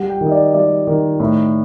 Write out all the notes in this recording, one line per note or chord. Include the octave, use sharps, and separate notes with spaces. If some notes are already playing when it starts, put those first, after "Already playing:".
Already playing: G3 F#5
G5
D#3
D#5
D5
G3 D5
D#3
A2